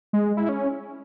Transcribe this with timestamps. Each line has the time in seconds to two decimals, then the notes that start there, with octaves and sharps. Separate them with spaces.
0.13 G#3
0.25 G#3
0.37 E4
0.49 C#4